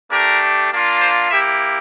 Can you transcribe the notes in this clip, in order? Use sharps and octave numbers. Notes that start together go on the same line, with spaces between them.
A3 D4 G4 A#4
A#3 D4 F4
C5
A#3 E4 G4 E5